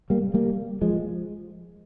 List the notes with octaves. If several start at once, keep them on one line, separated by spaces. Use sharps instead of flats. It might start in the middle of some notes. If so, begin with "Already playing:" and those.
G3 A#3
G3 A#3
F3 G#3